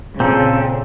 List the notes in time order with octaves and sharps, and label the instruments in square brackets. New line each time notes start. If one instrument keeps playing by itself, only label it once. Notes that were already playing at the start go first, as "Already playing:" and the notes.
[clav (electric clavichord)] A#2 [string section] C#3 [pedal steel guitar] C4 A4